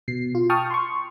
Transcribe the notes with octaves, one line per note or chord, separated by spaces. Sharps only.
B2 C7
F4
G5 A5 C#6 D#6 F6
C6 C#6